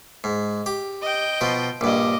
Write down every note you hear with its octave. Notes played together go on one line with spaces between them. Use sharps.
G#2
G4
D#5 G5
B2 F3
A#1 G2 D#5 D6